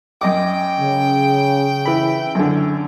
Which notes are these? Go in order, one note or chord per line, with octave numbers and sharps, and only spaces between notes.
F#2 D#5 G5 D6
C#3
E3 B5
F#2 D3